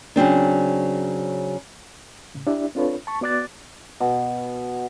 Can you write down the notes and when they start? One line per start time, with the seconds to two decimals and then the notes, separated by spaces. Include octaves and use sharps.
0.16 C#3 F#3 C4 D4
2.35 A2 C#3
2.47 D4 E4 G4 D5 E5
2.75 C4 D4 F4 A4 B4 C#5
3.07 A5 C#6
3.21 B3 F#4 D5 D6 F#6 A6
4.00 B2